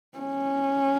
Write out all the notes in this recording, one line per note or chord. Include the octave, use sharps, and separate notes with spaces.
C#4